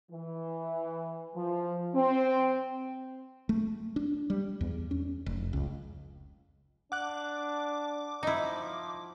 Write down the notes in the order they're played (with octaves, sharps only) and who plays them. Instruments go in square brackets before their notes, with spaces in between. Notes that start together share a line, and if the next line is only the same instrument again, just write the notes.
[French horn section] E3
F3
C4
[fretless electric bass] A3
D4
G3
E2
C#4
F1
C#2
[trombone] D4 [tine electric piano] F#5 F#6 [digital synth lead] D6
[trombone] F3 [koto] D#4 E4